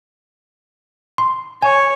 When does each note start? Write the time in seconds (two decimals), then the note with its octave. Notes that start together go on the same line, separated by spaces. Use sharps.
1.18 C6
1.62 C#5 G#5